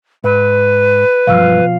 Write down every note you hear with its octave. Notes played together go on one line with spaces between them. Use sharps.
G#2 B4
B1 G2 B2 F3 F5